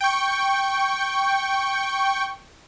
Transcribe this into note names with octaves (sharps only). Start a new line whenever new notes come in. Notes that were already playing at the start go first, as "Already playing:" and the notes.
G5 C#6